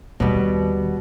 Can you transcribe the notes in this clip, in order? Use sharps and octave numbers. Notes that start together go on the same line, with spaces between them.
D#2 B2 D#3 G3